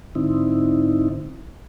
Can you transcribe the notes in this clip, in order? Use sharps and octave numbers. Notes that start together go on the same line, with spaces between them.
G#2 D3 C4 D#4 E4